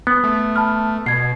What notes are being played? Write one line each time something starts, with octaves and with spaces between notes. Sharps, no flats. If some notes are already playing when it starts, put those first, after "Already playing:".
B3
A3
A5 B5 F6
B2 G#6 C7